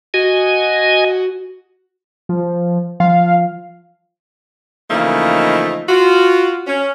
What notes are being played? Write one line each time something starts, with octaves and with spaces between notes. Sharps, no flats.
F#4 D#5 G#5
F3
F3 F5
C#3 E3 F3 A3 A#3 D#4
F4 F#4
C#4